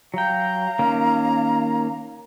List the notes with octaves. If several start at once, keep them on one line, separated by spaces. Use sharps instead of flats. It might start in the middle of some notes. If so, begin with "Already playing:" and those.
F#3 F5 G5 A#5
D#3 A#3 C#4